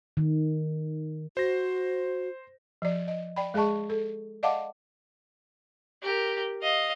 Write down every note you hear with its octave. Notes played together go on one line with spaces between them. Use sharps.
D#3
F#4 C5 A#6
F3 D5
D#5
D5 G5 B5
G#3 G#4 D#5 A5 C#6
A4
D5 D#5 F5 F#5 A5 D6
G4 A#4
D#5 F5